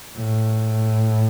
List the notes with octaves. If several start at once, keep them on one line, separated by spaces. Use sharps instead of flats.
A2